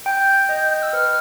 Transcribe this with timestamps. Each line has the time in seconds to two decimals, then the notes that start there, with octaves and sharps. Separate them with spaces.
0.06 G5 G6
0.49 D#5
0.83 E6
0.93 B4 F6